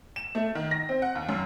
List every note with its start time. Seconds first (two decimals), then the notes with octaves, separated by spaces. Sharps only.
0.16 E7
0.35 A3
0.55 D#3
0.71 A#6
0.89 C4
1.02 F#5
1.15 D#2
1.29 F#2